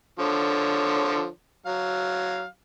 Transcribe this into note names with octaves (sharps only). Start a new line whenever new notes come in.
D3 F3 C#5
F#3 F5